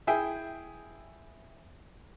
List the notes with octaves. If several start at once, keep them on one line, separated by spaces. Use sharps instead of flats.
E4 G#4 E5 G5 G#5